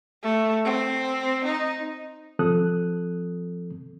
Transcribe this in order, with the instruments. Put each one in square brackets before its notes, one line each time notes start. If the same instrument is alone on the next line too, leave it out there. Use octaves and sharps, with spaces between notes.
[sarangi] A3
C4
D#4
[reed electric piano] F3 C4 A4 D#6 F#6